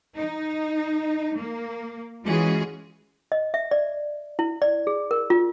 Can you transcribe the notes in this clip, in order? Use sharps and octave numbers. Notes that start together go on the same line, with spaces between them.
D#4
A#3
E3 G#3 C#4 F4 F#4 G#4
D#5
E5
D5
E4
D5
G#4
A#4
F4